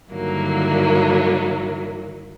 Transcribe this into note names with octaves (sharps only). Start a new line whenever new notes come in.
G2 D3 D#3 F#3 A#3 E4